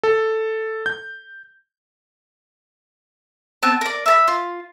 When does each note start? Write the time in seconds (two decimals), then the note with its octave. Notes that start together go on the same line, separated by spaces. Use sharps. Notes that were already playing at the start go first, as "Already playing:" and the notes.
0.03 A4
0.86 G6
3.62 B3 C4 A5
3.81 A#4 D5
4.06 E5 A5 B5
4.28 F4